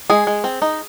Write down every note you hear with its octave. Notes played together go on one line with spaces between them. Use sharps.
G#3 G#4
G#3
C4
D#4